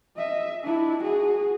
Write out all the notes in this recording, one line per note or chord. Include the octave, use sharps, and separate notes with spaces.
D#5 E5
D4 E4
F#4 G#4